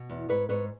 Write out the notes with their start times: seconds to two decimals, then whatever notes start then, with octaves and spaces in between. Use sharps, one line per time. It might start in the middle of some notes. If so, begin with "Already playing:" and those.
Already playing: B2
0.09 E2
0.29 G#2 B4 C#5
0.49 G#2 B4 C#5